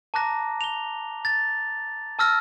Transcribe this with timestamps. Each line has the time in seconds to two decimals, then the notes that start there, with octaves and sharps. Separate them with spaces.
0.14 A5 A#5 D6 F#6 A#6
0.61 F7 G7
1.25 A6
2.19 A5 E6 F6 A#6